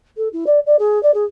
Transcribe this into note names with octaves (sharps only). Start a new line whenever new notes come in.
A4
E4
D5
D5
G#4
D5
G#4